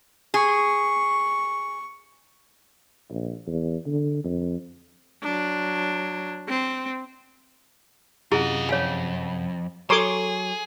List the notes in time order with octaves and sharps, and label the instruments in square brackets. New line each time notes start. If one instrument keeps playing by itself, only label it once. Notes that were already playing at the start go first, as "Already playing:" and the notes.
[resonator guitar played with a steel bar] G#4 [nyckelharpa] C#6
[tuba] A#1
E2
D3
F2
[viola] F#3 D4
C4
[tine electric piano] F#2 C3 F#5 [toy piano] E4 G#4 A#5 [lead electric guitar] F4 D#5
[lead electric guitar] B1 F2 [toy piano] C#5 F5 G#5
[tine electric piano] F#3 [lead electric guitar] G#4 [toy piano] A4 A#5 [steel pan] C#5 C6 D6